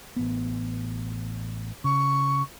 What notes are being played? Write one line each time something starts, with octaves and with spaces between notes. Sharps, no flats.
A1 B3
C#3 C#6